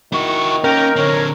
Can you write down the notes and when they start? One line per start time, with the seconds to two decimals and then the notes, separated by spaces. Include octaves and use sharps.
0.13 D#3 E4 F#4 C#6
0.64 A#3 C#4 A#4 G5
0.96 D3 C4 C#5